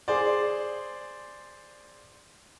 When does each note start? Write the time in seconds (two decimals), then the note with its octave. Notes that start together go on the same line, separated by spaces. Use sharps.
0.08 G#4 C5 D5